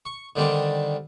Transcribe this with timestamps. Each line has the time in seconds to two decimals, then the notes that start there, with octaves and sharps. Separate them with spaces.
0.05 C#6
0.36 D3 D#3 G3 C4 D4